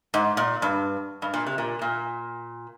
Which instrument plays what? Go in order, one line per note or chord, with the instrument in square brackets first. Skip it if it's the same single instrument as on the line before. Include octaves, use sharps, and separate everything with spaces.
[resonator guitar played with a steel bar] G#2
A#2
G2
G2
A#2
C3
A#2
A#2